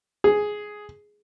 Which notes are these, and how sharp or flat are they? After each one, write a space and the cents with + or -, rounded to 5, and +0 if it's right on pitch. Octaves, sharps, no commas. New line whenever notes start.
G#4 +5